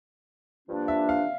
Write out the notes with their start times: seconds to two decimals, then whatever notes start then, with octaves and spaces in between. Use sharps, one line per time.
0.67 G2 F3 A#3 D4
0.88 E5
1.09 F5